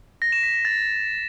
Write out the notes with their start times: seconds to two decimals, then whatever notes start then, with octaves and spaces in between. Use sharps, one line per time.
0.22 A#6
0.32 E7
0.43 B6
0.54 A#6
0.65 A6